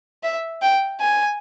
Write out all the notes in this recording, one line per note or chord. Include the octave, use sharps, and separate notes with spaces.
E5
G5
G#5